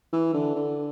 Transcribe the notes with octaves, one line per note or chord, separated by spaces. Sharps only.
E3
D3
D3